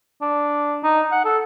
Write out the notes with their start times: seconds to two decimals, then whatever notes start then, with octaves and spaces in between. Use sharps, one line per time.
0.22 D4
0.84 D#4
1.12 F#5
1.25 A4